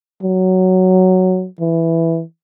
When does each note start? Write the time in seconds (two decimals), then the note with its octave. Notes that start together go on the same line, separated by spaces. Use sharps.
0.23 F#3
1.60 E3